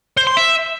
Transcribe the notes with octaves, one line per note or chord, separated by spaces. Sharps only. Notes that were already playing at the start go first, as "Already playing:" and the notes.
C5
C6
E5